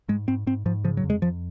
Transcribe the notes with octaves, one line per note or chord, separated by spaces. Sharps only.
G#2 G#3
G#2 C4
G#2 C4
G#2 F3
C#3 F3
F#3
F2
G#3
F2 F3